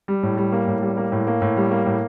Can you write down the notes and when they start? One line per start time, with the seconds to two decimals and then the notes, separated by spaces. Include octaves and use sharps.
0.08 G3
0.23 A2
0.37 G3
0.52 A#3
0.67 A2
0.82 G3
0.97 A#3
1.12 A2
1.27 A#3
1.42 A2
1.57 G3
1.71 A#3
1.86 A2